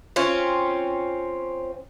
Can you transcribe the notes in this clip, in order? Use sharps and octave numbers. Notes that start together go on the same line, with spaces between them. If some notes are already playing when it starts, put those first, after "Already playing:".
C4 C#4 F4